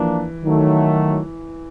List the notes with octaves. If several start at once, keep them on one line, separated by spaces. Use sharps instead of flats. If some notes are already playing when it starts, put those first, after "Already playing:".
Already playing: E3 F3 A#3 D4
D#3 F#3 A3